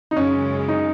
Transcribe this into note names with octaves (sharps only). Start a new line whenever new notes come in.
D#4
F#2 C#3 G#3 C#4
D#4